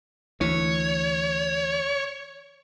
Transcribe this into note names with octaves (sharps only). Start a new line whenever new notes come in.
D2 E3 C#5